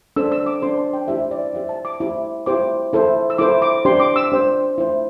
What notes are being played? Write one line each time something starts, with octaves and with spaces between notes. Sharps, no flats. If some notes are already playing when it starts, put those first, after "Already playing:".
D4 A4 C5 E6
E6
D6
D4 A4 C5 C6
A5
G5
E4 G4 C5 E5
D5
E4 G4 C5 E5
A5
D6
E4 G4 C5
E4 G4 C5 D6
E4 A4 C5
E6
E4 A4 C5 D6
D6
D4 G4 C5 C6
D6
E6
D4 G4 C5
E4 C5